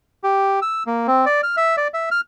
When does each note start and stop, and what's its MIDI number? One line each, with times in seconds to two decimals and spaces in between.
0.24 0.60 67
0.62 0.83 88
0.87 1.07 58
1.07 1.25 60
1.26 1.41 74
1.43 1.56 89
1.57 1.76 76
1.77 1.88 74
1.94 2.09 76
2.11 2.21 89